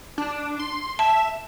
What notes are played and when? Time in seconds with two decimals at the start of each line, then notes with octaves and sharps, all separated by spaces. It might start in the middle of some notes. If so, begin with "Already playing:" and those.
0.18 D4
0.59 C6
0.99 E5 A5